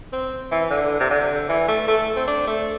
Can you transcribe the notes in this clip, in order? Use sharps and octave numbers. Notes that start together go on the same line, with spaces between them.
C4
E3
D3
C3
D3
E3
A3
A3
C4
D4
A3